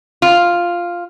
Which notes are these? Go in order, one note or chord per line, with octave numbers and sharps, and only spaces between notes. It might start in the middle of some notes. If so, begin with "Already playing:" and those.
F4